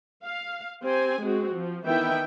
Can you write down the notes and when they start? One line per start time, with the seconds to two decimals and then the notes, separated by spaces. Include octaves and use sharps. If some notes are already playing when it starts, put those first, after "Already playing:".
0.23 F5
0.83 C4 G4 G#5
1.21 G#3 C4 F#4
1.54 F3
1.85 D#3 E3 B3 E4 E5 G5